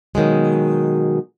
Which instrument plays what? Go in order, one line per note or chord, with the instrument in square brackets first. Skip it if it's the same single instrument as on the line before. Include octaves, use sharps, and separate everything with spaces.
[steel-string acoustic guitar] B2 D#3 F#3 G#3